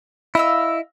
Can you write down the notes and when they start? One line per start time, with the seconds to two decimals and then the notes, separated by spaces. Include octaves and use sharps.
0.35 E4 D#5 F5 E6